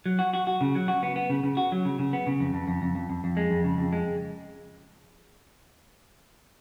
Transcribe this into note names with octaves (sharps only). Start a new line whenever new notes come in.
F#3
F#4
F#4
F#4
C#3
F#3
F#4
B3
B3
C#3
C#3
F#4
F#3
C#3
C#3
B3
C#3
F2
F2
F2
F2
F2
F2
F2
G#3
F2
C#3
F2
G#3